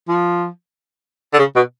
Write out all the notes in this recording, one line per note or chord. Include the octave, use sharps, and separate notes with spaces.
F3
D3
C#3
B2